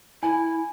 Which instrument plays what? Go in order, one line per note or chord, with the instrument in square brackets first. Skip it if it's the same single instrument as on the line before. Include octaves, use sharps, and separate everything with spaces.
[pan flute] E4 [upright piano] G#5